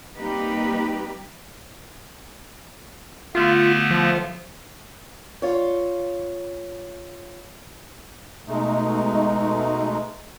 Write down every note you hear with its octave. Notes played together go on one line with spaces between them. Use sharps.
G3 A#3 C4 D#4 G4 B4
D3 A3 B3 F4
F3
F4 C#5
B2 G#3 A3 D#4